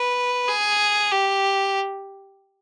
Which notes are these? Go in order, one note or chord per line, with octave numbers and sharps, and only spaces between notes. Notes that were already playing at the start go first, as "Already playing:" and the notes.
Already playing: B4
G#4
G4